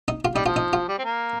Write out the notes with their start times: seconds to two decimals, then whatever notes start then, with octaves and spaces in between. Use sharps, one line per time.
0.08 D#4
0.25 F4
0.35 G3 D#4
0.46 F3 F4
0.56 D#4
0.73 F4
0.88 G3
0.98 C4
1.04 A#3